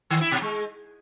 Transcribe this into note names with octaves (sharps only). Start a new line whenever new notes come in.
D#3
E4
B2
G#3